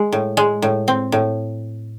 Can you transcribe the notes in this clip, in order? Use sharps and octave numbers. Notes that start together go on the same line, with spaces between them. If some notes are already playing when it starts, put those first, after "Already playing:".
Already playing: G#3
A2
G#3
A2
C4
A2